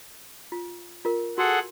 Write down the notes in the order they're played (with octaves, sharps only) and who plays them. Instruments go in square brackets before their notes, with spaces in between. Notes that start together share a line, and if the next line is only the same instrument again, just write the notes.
[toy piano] F4
F4 A#4
[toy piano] F#4 [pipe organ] G#4 A4 F#5